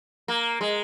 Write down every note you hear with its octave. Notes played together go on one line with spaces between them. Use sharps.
A#3
G#3